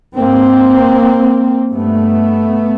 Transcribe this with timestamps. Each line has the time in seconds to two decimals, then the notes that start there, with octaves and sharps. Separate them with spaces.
0.16 G#2 A#3 C4
1.73 G2 A3 B3